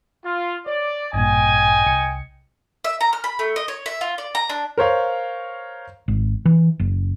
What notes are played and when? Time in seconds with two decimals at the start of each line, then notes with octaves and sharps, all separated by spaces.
0.23 F4
0.66 C#5 D5
1.13 A1 G2 A#2 D#5 G5 G#5
1.86 C2 C#7
2.84 E5
3.01 A#5
3.13 F6
3.24 B5
3.39 A3
3.56 D#5
3.68 C#5
3.86 E5
4.01 F4
4.18 D5
4.35 A#5
4.50 D4
4.78 A#4 C5 C#5 F5
6.08 G#1
6.45 E3
6.80 F#1